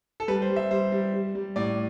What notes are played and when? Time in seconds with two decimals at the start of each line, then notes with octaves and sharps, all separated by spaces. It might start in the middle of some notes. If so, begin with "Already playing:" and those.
0.20 A4
0.28 G3 B4
0.42 C5
0.50 G3
0.56 E5
0.71 G3 C5
0.92 G3
1.14 G3
1.35 G3
1.56 A2 D5